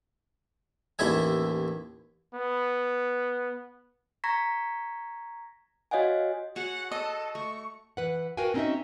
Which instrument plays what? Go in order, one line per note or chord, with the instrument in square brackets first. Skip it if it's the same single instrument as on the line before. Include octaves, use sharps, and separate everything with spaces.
[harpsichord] A1 D#2 E4 A4 E5 G#5
[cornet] B3
[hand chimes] A#5 C#6 G#6 A#6 B6
F#4 C#5 D#5 F5 F#5 G#5
[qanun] F#4 G#4 C#5 [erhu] F#5
[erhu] A4 [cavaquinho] D#5
[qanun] A3 [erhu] C#6
[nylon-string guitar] E3 B4 F#5
F#4 A#4 B4 F5 G5 G#5
C4 C#4 D#4 F#4 D#5 E5